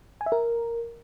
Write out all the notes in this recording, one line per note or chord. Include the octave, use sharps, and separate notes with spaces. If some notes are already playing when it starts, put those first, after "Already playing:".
G#5
E5
A#4